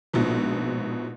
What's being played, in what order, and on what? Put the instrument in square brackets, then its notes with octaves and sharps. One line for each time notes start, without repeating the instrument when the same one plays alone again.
[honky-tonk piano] A#1 G#2 B2 F3